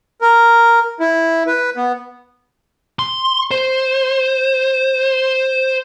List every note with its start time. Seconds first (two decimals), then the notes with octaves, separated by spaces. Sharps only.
0.21 A#4
1.00 E4
1.47 B4
1.77 B3
2.99 C6
3.51 C5